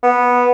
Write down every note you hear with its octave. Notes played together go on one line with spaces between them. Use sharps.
B3